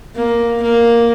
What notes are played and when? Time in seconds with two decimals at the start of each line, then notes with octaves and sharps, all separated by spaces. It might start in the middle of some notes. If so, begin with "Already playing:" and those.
0.15 A#3
0.62 A#3